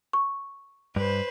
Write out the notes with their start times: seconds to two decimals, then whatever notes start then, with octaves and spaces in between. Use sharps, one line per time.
0.13 C#6
0.96 G2 B4 C5